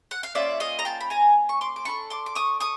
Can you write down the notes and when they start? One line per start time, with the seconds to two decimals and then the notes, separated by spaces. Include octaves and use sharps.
0.11 F#5
0.23 F5
0.35 A#3 C#4 F4 D5 E5
0.60 D#5 F5
0.79 A#5
0.85 G5 A5
1.00 B5
1.10 G#5 A#5
1.49 C#6
1.61 C6 D6
1.76 D6
1.85 D4 F#4 A4 B5 C#6
2.10 C6 D6
2.26 D6
2.35 C#6 D#6
2.60 C#6 D#6